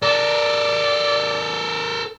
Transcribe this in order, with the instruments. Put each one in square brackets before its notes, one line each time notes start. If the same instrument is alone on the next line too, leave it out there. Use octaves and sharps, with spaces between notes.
[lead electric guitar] A4 A#4 [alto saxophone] D5